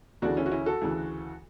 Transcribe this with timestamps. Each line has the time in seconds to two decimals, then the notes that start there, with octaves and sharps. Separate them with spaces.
0.22 D2 C#3 E3 D4 F#4
0.37 C#4 E4
0.46 F#4
0.51 C#4 E4
0.66 F#4 A4
0.82 D2 C#3 E3